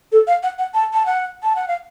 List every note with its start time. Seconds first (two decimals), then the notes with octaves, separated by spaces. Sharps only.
0.12 A4
0.27 F5
0.43 F#5
0.59 F#5
0.74 A5
0.94 A5
1.06 F#5
1.43 A5
1.56 F#5
1.68 F5